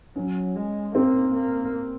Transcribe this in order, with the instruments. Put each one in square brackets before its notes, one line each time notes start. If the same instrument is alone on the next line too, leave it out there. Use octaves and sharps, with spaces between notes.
[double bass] F#3 [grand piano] C#4
[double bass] G#3
[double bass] A#3 [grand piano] C4
[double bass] A#3